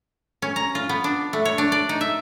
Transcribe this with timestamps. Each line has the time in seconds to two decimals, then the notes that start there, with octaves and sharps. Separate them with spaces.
0.42 C#4
0.56 A#5
0.75 F4
0.89 B3
1.04 D4
1.33 A3
1.45 C#5
1.58 D4
1.72 D5
1.89 D#4
2.01 E5